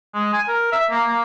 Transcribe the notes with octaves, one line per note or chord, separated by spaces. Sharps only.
G#3
G#5
A#4
E5
A#3
A#3